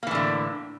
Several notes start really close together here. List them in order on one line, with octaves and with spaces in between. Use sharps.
A#3 E3 A2 D3